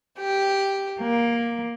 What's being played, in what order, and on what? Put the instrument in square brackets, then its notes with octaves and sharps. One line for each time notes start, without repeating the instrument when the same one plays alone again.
[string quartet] G4
A#3